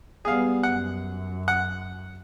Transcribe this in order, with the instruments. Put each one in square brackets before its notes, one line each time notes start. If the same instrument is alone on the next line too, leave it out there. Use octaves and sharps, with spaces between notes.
[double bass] G3 B3 [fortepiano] G#4 F5
[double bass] F#2 [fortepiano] F#5
[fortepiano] F#5